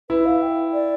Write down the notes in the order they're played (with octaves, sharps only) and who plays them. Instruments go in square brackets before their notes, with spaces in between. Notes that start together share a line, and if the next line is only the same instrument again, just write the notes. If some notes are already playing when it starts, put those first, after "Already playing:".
[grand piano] E4 [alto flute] B4
[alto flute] F5
G5
D5